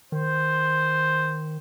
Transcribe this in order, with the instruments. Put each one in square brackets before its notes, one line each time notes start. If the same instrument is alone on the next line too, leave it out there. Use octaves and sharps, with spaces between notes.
[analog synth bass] D#3 [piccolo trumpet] C5